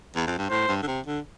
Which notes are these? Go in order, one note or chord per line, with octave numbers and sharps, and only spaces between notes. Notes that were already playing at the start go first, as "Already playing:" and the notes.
E2
F2
G2
A2 C5
G2
D3
C3
D3